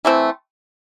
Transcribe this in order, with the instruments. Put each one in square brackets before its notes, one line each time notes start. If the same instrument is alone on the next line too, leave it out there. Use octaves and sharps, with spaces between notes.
[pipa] E3 A3 C4